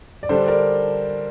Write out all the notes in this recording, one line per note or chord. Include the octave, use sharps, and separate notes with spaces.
D5
D3 G3 D4 A4 C5
A#4 D5